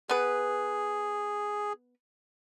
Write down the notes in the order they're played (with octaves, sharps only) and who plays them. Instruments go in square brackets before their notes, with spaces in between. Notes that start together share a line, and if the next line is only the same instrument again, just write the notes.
[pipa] B3 B4 [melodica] G#4